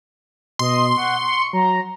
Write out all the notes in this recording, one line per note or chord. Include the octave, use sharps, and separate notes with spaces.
B2 D#5 C6
F#5 C#6
C#7
F#3 A#5